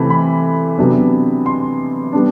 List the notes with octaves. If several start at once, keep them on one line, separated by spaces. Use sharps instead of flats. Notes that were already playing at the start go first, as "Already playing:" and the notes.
Already playing: C3 E3 A3 C4 B5
B5
C3 F#3 B3 D4
C6
G3 B3 D4